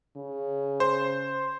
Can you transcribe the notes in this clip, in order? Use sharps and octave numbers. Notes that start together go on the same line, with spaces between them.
C#3
C5